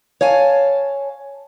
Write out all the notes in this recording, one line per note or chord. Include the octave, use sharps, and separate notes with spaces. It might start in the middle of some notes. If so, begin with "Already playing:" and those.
C#5 F5 G#5 A5